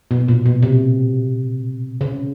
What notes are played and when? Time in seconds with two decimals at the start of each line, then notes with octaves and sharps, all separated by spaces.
0.11 B2
0.28 A#2
0.46 B2
0.63 C3
2.01 C#3